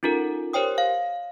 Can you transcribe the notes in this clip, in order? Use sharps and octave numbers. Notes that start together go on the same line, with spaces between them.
C#4 D#4 F4 A4 A#4
G4 A#4 C5 C#5 G5 D#6
F5